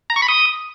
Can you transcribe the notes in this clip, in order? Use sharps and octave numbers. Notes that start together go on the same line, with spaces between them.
A#5
C#6
B5
D#6